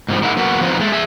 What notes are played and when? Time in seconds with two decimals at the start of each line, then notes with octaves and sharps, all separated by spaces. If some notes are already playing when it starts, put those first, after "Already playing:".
0.08 G#2 C3 F3 G3
0.22 A#3 D#4 E4 G#4 F#5
0.37 F#3 A#3 B3 F#4
0.61 F3 F#3 B3 C4 D#4
0.80 G#3 A3
0.92 G#4 E5